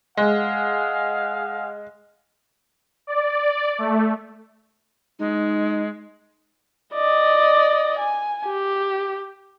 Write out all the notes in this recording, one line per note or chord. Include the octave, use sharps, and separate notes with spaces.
G#3 G#4 F5 F#5
D5
A3
G#3 D#4
D5 D#5
G#5
G4